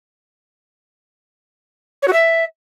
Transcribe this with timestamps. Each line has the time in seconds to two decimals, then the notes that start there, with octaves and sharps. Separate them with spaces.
2.02 C#5
2.07 F#4
2.12 E5